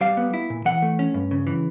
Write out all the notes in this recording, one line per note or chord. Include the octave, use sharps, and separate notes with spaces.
G3 F5
B3
E4
A#2
E3 F#5
A3
C#4
G2
C#3
E3